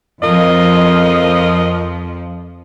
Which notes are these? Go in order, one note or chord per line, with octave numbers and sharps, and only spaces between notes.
F2 F3 F4 A#4 D#5